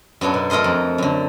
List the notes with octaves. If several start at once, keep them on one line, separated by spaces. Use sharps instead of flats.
F#2 B3 D4 A4
B2
A3 A4 A#4 D#5 C6
F2
F#2 D3